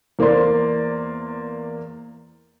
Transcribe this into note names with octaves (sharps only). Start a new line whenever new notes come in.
E2 A#3 C5 D5 C6